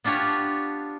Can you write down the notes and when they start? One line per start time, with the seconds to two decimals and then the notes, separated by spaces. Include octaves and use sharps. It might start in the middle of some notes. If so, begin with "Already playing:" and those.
0.04 B3 D4 F4 G4 C#5